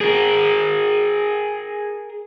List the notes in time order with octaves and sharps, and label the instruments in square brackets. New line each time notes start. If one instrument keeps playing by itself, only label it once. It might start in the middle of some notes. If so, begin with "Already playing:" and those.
[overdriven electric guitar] G#4 A#4